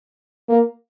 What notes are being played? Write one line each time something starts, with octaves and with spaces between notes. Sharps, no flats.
A#3